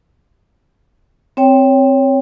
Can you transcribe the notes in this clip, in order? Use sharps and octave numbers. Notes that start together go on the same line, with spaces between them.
C4 C#5 G5